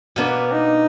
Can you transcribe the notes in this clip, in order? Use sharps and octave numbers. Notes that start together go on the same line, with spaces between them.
B2 A#3 B3 D4
D#4